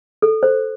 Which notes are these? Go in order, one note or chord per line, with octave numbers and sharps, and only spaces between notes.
A4
C5